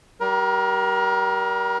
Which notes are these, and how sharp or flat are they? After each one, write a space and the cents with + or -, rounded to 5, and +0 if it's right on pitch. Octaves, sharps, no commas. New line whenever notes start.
G3 -20 A#4 +30